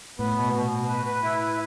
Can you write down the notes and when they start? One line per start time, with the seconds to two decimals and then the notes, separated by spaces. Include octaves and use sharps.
0.19 A2 B3
0.36 B2
0.54 B2
0.71 B2
0.88 B4
1.06 B4
1.23 E4
1.41 B4